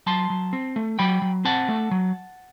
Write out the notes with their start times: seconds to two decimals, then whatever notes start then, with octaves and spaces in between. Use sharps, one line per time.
0.07 F#3 A5 C6
0.30 F#3
0.53 C4
0.76 A3
0.99 F#3 G5 B5
1.22 F#3
1.45 C4 F#5 A5
1.69 A3
1.91 F#3